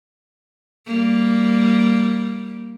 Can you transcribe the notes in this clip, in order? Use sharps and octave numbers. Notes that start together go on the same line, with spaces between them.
G3 A#3